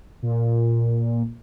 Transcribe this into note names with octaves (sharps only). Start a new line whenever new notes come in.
A#2